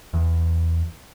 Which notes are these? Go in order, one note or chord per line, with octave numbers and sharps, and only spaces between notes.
E2